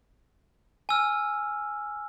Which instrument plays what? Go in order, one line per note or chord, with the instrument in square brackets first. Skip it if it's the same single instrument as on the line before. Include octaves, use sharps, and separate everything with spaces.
[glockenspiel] G#5 E6 F6